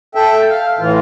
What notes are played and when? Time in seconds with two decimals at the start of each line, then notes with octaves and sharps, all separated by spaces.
0.15 A4 E5 G5
0.50 F5
0.79 A2 E3 F4